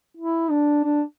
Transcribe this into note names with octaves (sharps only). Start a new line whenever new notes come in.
E4
D4
D4